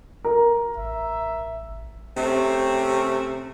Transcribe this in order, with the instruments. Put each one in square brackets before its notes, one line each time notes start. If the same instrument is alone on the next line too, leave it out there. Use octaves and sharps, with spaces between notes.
[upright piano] A#4
[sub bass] A1 [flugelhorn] E5
[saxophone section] C3 A3 C4 C#4